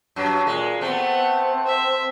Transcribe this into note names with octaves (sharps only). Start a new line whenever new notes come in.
F#2 F#3
A#2 G#3
A3 B3 C4 F#5
E5